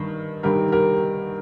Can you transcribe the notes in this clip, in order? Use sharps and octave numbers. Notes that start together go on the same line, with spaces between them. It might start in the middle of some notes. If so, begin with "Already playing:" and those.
Already playing: G2 D#3
G2 D#3 G4 A#4
G4 A#4